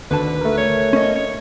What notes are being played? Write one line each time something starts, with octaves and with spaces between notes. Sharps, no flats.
D2 D3 D#3 B4 A5
A3 A#4
C#5
C#4 D#5
C#5